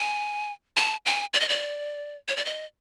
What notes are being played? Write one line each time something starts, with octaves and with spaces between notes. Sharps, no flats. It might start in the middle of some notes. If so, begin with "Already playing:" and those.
Already playing: G#5
A5
G#5
D5
D#5
D5
C#5
D5
D#5